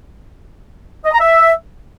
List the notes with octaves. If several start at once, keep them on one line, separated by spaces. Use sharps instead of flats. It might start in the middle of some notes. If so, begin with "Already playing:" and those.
D#5
A#5
E5